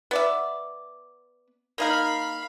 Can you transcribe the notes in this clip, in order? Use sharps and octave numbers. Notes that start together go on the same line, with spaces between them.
B3 D5 E5
A#3 D#4 A#4 F5 B5